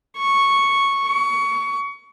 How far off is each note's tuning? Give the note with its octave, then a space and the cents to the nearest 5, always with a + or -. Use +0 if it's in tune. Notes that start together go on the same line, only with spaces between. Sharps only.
C#6 -5
C#6 +25